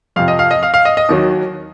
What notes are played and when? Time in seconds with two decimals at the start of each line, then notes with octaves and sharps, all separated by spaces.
0.16 F2 C3 F3 F5
0.28 D#5
0.39 F5
0.51 D#5
0.63 F5
0.74 F5
0.85 D#5
0.97 D#5
1.09 D#2 D#3 F#3